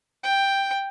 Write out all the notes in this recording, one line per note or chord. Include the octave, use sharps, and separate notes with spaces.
G5